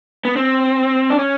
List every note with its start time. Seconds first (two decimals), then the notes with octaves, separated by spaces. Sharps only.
0.25 B3
0.36 C4
1.10 D4
1.19 C#4